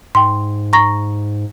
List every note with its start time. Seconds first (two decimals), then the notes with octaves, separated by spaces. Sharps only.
0.15 G#2 G5 C6
0.73 A#5 C#6 A#6